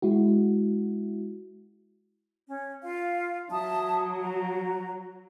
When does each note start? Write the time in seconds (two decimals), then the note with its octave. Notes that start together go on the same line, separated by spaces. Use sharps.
0.02 G#3 E4 F#4
2.47 C#4
2.82 F4 F5
3.51 F#3 E5 A5 D#6
4.19 F#4 A#5